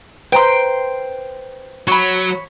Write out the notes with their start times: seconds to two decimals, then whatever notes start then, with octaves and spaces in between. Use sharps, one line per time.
0.32 B4 C5 G5 A#5 C6
1.88 F#3 C#5 B5